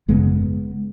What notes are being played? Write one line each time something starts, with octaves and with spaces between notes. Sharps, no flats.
G#1 F#2 C#3 G#3 B3